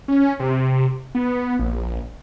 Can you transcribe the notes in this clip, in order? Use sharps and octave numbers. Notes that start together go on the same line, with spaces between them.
C#4
C3
B3
A#1